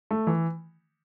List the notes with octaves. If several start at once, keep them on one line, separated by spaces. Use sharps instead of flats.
A3
E3